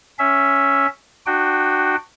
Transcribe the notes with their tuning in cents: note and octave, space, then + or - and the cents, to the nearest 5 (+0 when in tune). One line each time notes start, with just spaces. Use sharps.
C#4 +0 E5 +0
D4 +30 F#4 +0 G5 -5